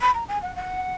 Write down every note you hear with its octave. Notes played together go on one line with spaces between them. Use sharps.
B5
A#5
G#5
F#5
F#5